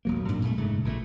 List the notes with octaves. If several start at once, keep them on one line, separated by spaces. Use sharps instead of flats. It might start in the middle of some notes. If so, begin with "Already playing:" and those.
D#1 F#3 A#3
G2 A#2 A#3 D4
A#2 G#3 A3
F#1 G#2 C#3 A3
A#1 A#2 D#3 A3